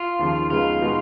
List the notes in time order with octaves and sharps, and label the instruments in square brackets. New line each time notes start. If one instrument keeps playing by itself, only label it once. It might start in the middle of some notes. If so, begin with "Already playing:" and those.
Already playing: [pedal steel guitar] F4
[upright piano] D#2 C#3 F3
[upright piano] C#3 G#3 B3 D#4 [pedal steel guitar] F4
[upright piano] B2 G#3 B3 D#4 F#4